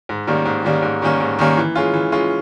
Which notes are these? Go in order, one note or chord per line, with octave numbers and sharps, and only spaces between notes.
G#2
D#3 G3 A#3 C#4
G#2
D#3 G3 A#3 C#4
G#2
D#3 G3 A#3 C#4
G#2
D#3 G3 A#3 C#4
E3
G#3 C#4 F4
E3
G#3 C#4 F4